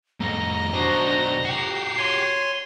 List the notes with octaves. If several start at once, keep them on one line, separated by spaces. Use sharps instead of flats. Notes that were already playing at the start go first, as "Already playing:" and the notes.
F2 A2 D#5 A#5
B1 D4 F#4 C5
F#4 G4 C7
C#5 G#5 C6